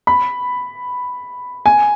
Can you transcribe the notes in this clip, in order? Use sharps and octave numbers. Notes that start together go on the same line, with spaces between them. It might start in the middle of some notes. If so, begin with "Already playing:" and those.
B5
G#5